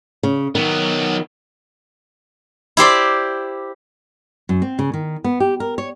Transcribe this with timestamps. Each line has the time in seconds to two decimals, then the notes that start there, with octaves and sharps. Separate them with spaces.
0.23 C#3
0.55 D#3 F#3 B3
2.77 E4 G4 C5 D5
4.49 F#2
4.62 C4
4.79 C#3
4.94 D#3
5.24 B3
5.40 G4
5.60 A#4
5.78 C#5